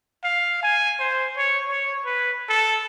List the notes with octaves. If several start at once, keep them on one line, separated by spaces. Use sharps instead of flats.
F5
G#5
C5
C#5
C#5
B4
A4